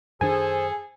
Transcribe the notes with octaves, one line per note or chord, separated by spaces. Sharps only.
F#2 D#3 D4 G#4 A4 C5 G#5